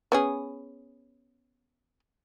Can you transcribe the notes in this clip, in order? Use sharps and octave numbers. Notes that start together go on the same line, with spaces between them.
B3 C#4 G#4